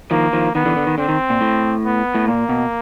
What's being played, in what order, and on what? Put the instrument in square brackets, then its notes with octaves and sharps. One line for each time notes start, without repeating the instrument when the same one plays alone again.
[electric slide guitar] D#3 F3 [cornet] A#3
[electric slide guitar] D#3 F3
[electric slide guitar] D#3 [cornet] B3
[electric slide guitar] D3 E3
D3
D#3
[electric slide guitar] D3 [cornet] C4
[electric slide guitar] D#3
A#2
A2
[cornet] B3
[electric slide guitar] A2
[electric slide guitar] A#2 [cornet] A#3
[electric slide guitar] B2